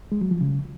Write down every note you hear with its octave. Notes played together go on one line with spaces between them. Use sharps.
G#3
F#3
F3
C#3